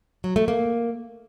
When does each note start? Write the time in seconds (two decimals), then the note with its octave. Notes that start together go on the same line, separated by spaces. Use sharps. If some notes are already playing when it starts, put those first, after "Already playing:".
0.24 F#3
0.36 A3
0.48 A#3